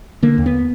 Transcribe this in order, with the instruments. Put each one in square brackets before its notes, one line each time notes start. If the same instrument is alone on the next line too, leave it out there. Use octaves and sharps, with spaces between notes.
[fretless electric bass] D3 A#3
D#2
B3